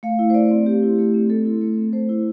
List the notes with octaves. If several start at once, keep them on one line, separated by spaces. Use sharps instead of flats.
A3 F5
E4
C5
A3 D5
C4
A3 G4
E4
A3
C4
A3 A4
E4
A3
C4
A3 C5
E4